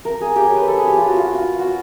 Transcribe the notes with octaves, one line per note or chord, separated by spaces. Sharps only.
A#4
G#4
G4
C#5
B4
A4
G#4
G4
F4
F#4
F4
F#4
F4
F#4